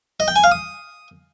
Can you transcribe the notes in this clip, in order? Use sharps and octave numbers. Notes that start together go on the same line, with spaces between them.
D#5
G5
G#5
F5
D#6